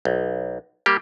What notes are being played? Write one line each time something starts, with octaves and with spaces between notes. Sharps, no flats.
B1
G3 A#3 G4